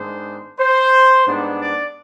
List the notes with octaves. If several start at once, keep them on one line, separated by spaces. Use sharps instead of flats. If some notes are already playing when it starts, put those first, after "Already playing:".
Already playing: G#2 D#3 G#3 B3 D4 C5
C5
G#2 G3 B3 D4
D5